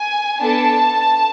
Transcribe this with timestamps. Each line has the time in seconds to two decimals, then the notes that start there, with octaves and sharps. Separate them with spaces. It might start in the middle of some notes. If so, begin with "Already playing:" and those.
Already playing: G#5
0.41 B3 D4 A4 A5